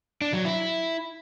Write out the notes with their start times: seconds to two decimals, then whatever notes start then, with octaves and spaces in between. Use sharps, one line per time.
0.21 D4
0.33 F#3
0.45 E4